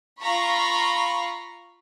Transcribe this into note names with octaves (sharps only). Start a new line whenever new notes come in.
F4 F5 A#5 B5 C#6